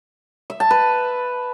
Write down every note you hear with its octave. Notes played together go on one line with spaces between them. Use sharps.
E5
A5
B4